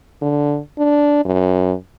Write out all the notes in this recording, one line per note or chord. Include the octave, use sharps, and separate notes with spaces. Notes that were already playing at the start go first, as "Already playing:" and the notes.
D3
D4
F#2